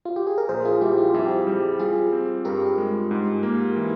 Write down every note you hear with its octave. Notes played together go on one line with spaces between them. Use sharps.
F4
G4
G#4
A#4
A#1 G#4 C5
F4 G#4
G3 E4 G4
F4
F2 E4 G4
G3
G3 F4 G#4
C4
G2 G4 A#4
G#3
G#2
A#3
E3